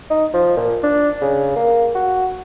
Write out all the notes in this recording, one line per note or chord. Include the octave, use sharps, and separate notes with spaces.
D#4
F3
A#2
D4
C#3
A#3
F#4